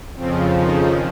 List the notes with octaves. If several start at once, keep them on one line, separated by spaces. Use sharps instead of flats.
F2 C#3 F3 C4
D#3 D#4